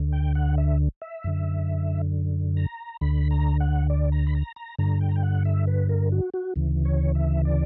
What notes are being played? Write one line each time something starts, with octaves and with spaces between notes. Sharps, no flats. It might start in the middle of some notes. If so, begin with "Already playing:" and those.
Already playing: D2 D3
G5
F#5
E5
E5
F#2 D3
A#5
D2 D3 B5
A#5
F#5
D5
A#5
B5
A#5
A#5
G2 D3 A#5
G5
A#5
G5
F#5
E5
B4
A#4
F#4
F#4
D2 C#3 E3
C#5
E5
D5